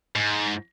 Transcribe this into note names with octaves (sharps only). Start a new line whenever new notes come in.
G#2